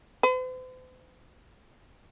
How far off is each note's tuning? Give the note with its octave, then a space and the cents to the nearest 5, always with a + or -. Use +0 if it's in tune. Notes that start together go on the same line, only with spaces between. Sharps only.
C5 -45